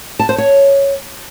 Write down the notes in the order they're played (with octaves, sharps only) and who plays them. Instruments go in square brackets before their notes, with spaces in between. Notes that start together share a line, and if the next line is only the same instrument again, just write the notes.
[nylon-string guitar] A5
C5
C#5